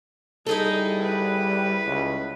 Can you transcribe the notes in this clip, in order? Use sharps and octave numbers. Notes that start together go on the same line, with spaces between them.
G3 D#4 E4 G#4 A4
B4
C#2